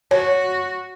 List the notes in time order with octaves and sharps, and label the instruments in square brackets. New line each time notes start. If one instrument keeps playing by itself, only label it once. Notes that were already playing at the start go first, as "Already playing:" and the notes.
[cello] F#4 [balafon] C#5